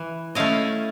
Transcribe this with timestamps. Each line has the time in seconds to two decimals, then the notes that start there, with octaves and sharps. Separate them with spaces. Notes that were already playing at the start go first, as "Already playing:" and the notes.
Already playing: E3
0.35 A3 C#4 E4 D#5 F5